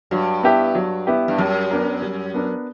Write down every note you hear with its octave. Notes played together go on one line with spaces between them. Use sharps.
G2 F#3
B3 E4 G4
F#3
B3 E4 G4
G2
F#2 G3
B3 D4 A#4
G3
B3 D4 A#4